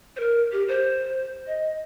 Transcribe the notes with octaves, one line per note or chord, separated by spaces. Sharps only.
C5
A#4
G4
C5
D#5